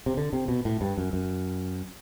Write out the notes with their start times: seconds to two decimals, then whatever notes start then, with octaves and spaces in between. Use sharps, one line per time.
0.06 C3
0.17 D3
0.33 C3
0.48 B2
0.65 A2
0.81 G2
0.98 F#2
1.13 F#2